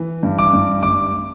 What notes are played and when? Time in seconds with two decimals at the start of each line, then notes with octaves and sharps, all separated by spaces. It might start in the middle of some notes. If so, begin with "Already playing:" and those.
Already playing: E3
0.23 G2
0.39 D6
0.53 G2
0.83 G2 D6